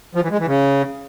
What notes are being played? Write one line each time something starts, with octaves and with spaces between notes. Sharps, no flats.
F3
E3
G#3
E3
C#3